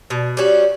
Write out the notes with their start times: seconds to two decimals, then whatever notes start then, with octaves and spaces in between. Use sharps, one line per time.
0.10 B2
0.37 G3 C#4 F#4